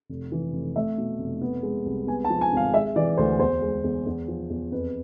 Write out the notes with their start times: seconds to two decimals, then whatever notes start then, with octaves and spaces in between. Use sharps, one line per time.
0.09 F1
0.32 E3
0.53 F1
0.76 A3 E5
0.98 B2
1.19 F1
1.41 B3
1.63 G#3
1.86 C2
2.07 B3 G#5
2.24 A5
2.30 F3
2.41 G#5
2.52 G#1 F5
2.73 G#3 E5
2.96 E3 D5
3.17 D2 C5
3.39 E2 C5
3.62 G#3
3.84 E2
4.06 E2
4.28 F3
4.50 E2
4.72 F2 B4